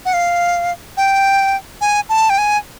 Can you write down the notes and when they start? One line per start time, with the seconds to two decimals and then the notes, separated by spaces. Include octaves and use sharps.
0.05 F#5
0.13 F5
0.97 G5
1.81 G#5
2.09 A5
2.30 G5
2.38 G#5